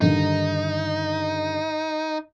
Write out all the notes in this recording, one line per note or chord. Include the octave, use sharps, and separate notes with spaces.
G2 D3 D#3 D#4